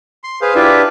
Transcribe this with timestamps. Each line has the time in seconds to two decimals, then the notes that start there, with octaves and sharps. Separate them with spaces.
0.24 C6
0.41 G#4 B4 C5 F5
0.55 D4 E4 F4 G4 B4 E5